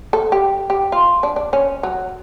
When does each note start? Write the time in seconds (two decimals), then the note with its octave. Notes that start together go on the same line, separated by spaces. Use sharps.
0.13 A4
0.32 G4
0.70 G4
0.92 F4
1.23 D4
1.36 D4
1.53 C#4
1.83 F#3